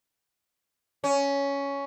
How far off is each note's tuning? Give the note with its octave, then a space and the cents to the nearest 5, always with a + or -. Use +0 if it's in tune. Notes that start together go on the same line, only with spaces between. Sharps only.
C#4 +10